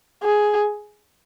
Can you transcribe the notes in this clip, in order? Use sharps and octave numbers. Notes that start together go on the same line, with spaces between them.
G#4